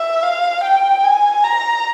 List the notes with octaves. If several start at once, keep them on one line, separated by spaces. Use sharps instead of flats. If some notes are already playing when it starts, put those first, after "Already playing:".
Already playing: E5
F5
G5
G#5
A#5